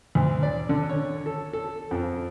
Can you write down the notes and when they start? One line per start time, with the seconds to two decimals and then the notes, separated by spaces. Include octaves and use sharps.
0.15 D2
0.43 D5
0.69 D3
0.89 C#5
1.26 A4
1.53 A4
1.91 F2